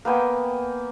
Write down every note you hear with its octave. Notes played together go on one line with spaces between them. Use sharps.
A#3 B3 G5 G#5